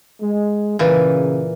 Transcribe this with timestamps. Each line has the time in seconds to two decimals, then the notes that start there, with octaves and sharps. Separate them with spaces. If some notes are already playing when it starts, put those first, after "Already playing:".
0.22 G#3
0.79 A#2 C#3 E3